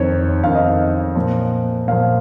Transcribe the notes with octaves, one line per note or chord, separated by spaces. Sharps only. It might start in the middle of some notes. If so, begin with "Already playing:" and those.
Already playing: F2 D#3 C5 C#5
F2 D#3 F5
D#5
F5
A#2 F3
A#2 F3 F5